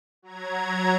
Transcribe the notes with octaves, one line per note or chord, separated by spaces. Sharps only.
F#3 A#5 G#6